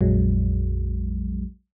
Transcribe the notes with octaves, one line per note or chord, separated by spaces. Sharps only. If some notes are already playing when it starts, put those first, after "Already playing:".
A#1 F2 F#3 G#3